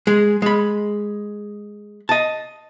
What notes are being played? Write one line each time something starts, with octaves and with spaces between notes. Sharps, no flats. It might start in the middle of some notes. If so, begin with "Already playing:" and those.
G#3 G#4
G#3 B5
D#5 A5